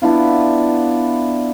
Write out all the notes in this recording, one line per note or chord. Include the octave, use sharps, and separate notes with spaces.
B3 D4 E4 F4